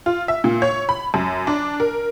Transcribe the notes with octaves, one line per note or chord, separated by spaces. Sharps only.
F4
E5
A#2
C#5
B5
F#2
D4
A#4